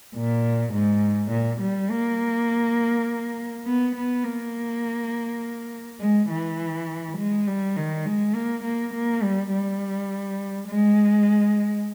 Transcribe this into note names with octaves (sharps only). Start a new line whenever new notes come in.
A#2
G#2
A#2
G3
A#3
B3
B3
A#3
G#3
E3
G#3
G3
D#3
G#3
A#3
A#3
A#3
G3
G3
G#3